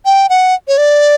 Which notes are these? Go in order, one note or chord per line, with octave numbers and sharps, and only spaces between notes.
G5
F#5
C#5
D5